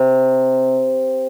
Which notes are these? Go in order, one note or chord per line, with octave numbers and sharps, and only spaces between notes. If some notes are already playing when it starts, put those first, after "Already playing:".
Already playing: C3